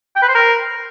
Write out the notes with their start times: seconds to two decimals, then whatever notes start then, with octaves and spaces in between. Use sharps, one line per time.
0.16 G5
0.22 B4
0.29 C5
0.35 A#4